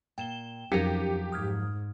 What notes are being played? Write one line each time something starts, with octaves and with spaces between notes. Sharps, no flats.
A#2 G5 E7 G7
F2 F3 F#3 C#4 D#4 G4 A#4
G#2 D#6 F6 G#6